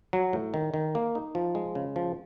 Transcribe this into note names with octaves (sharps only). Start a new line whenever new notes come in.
F#3
A2
D#3
D#3
A#3
D#4
F3
G#3
C#3
F3